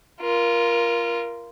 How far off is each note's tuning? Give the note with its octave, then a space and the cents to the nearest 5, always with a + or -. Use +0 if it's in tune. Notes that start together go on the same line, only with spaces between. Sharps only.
F4 -15 A#4 +20